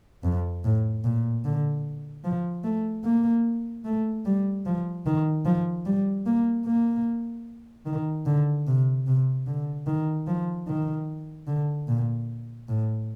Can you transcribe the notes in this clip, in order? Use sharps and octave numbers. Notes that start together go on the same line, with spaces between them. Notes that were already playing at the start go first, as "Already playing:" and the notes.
F2
A2
A#2
D3
F3
A3
A#3
A3
G3
F3
D#3
F3
G3
A#3
A#3
D#3
D3
C3
C3
D3
D#3
F3
D#3
D3
A#2
A2